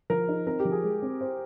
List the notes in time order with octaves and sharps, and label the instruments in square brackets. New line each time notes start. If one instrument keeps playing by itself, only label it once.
[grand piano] F3 [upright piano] A#4
[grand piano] D#4
[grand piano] C4 [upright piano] A#4
[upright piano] G4
[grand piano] F3
[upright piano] G#4
[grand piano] G#3
C4
C5